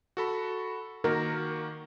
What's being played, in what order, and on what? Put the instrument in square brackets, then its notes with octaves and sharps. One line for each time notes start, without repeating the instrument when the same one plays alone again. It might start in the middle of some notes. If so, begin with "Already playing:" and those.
[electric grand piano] F#4 A4 B5
[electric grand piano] D#3 A#3 F#4 [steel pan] A#4